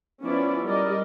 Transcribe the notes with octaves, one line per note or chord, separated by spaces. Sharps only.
F3 B3 C#4 E4 F4 D5
G3 A#4 D5 D#5